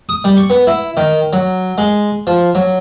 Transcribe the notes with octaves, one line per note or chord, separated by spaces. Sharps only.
D#6
G3
C#6
B3
E4
D#3
F#3
G#3
F3
F#3